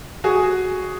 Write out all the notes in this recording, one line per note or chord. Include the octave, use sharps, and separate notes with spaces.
F#4 G#4